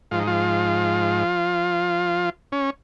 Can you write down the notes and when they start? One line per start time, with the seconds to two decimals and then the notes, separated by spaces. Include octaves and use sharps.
0.11 G#2 F3 F4
0.19 D#4
0.27 F3 F4
2.52 C#4